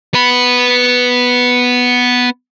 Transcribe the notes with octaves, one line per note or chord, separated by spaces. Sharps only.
B3 B5